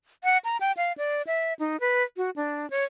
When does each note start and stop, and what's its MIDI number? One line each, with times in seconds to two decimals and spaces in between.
0.24 0.38 78
0.45 0.57 82
0.61 0.72 79
0.77 0.92 77
0.98 1.22 74
1.27 1.54 76
1.59 1.79 63
1.80 2.03 71
2.17 2.30 66
2.36 2.69 62
2.70 2.84 73